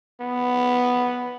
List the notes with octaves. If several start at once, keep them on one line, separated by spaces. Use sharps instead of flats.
B3